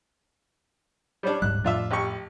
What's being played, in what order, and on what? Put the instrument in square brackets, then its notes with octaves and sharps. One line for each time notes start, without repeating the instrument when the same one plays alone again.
[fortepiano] G3 C#4 D4
[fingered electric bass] D1 G#2 G3 [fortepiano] F#6
[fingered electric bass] F2 A2 [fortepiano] D4 F4 E5
[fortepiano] A1 G4 C#6